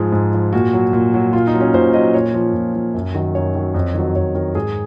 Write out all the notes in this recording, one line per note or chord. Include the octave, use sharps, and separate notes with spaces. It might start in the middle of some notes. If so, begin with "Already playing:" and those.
Already playing: G#2 F3 G#4
G#2
F3
A#2 F#4
F#3
A#2
F#3
A#2 F4
D#4
F#3
C#4
A#2 C5
F#3 D#5
A#2 C#5
F3
A#2
F3
F#2
D#3 F#3
F#2 C#5
D#3 F#3
F2
D#3 F#3
F2 C#5
D#3 F#3 A#4
G#2 G#4